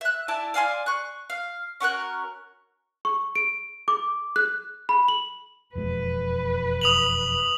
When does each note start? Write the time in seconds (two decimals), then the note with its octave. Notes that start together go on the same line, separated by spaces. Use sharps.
0.01 E5 F#6
0.28 E4 D5 G#5 A5
0.54 D5 F5 G#5 C6
0.86 C#6 F#6
1.30 F5
1.80 C#4 F#4 A#4 F#6
3.05 C#6
3.35 D7
3.88 D6
4.36 F#6
4.89 B5
5.08 F#7
5.75 E1 F2 G#3 B4
6.81 D#6 F7 F#7